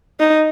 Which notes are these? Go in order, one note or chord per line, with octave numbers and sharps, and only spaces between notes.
D#4